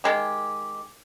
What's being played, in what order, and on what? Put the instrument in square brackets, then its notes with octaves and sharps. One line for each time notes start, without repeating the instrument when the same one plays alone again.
[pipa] D#3 F3 G#3 G4